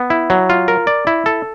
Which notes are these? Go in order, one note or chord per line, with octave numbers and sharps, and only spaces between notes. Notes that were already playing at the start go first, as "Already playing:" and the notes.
Already playing: B3
E4
F#3
F4
A#4
D5
E4
A4